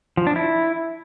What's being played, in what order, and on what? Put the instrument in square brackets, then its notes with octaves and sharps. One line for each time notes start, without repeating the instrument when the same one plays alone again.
[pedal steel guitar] F3
D4
E4